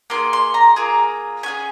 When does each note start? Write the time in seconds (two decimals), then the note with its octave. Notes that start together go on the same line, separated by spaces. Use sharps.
0.10 A#3 F4 G#4 C6
0.33 C6
0.54 A#5
0.76 A#3 F4 G#4
1.43 C#4 F4 G#4 G#5